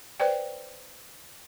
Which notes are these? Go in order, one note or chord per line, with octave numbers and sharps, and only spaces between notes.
B4 C5 D5 G5